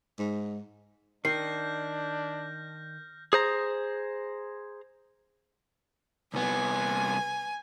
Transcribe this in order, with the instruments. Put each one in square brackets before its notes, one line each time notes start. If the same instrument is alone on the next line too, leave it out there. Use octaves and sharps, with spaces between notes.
[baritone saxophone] G#2
[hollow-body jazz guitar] D#3 [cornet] D4 [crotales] F6 G6 A#6 [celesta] C7
[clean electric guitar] G#4 C5 A#5
[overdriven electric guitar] C2 B3 [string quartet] G#5